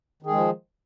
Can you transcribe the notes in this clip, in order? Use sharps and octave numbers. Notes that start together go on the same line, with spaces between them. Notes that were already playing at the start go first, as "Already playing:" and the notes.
D#3 F3 G#3 G#4